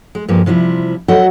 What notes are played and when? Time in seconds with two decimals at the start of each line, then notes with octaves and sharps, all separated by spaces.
0.15 G#3
0.28 G2 F3 G#3 A#3 C4
0.46 C3 F3 G3 E4
1.08 F#3 F#4 A4 D#5 E5 F#5